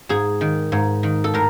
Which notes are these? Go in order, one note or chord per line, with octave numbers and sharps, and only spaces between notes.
G#2 G#4
D#3
G#2
D#3
A4
A2 A#4